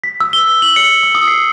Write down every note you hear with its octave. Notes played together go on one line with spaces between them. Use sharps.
B6
E6
G7
B6
F#7
C#7
E6
D#6
C7